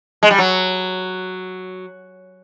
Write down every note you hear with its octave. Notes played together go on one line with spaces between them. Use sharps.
G#3
G3
F#3